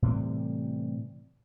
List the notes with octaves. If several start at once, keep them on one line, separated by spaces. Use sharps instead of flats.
A2 C3 E3 G3